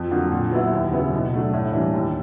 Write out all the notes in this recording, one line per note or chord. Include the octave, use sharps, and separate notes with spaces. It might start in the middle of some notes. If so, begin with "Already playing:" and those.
Already playing: F2
D3 F#3 A#3
A#2
F#3 B3 E4
D#2
C#3 F#3 B3 E4
B2
F#3 A3 D4
A2
E3 G3 A#3 D4
D#2